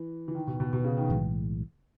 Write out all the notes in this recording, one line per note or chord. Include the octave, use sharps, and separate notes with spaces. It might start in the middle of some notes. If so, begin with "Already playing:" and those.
Already playing: E3
E3
D#3
B2
B2
B2
C#3
D#3
B1 A2 E3 G#3